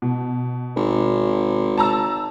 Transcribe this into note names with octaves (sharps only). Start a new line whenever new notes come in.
B2
G#1
A5 A#5 E6